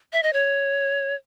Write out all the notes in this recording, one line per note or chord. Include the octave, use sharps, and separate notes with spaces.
E5
D#5
C#5